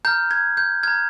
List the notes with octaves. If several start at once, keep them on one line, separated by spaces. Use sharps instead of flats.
A#5 F6 G6
G#6
G6
A#5 F6 G#6